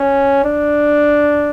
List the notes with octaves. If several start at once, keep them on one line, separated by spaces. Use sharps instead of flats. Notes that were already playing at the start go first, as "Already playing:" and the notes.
Already playing: C#4
D4